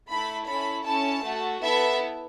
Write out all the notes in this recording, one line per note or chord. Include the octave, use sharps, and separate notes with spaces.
A3 E4 A4 B5
C#4 E4 A4 B5
C#4 E4 A4 A5
A3 F#4 A4
B3 E4 A4 E5